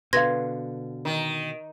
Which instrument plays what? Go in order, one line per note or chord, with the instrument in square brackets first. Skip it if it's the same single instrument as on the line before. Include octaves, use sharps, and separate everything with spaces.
[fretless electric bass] B2 D3 [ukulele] B4 F5 [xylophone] C6 G#6 A#6
[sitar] D#3